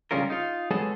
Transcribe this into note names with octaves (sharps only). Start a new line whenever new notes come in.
C#3 G3 G#3 C#4 F4 A#4
D#4 F4
F#3 G#3 B3 G#4 A4